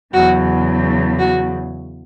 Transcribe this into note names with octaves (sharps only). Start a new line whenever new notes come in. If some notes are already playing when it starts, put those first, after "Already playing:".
E2 C#3 F#3 F#4
F#4